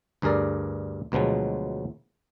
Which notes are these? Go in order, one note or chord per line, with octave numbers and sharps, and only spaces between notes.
D2 G2 G#4 A#4 D5
D2 B2 F3 F#3 G#3